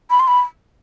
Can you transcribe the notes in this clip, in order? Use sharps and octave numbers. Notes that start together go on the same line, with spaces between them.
B5
C6
B5